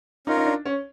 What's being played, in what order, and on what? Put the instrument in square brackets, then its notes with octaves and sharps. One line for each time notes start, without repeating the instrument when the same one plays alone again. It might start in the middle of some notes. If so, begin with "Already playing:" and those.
[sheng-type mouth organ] C#4 F4 A#4 [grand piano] D#4
[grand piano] D#4
D4
C#4